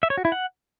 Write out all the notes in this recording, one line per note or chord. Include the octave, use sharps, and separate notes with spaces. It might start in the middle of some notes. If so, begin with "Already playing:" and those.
E5
C#5
F#4
E4
F#5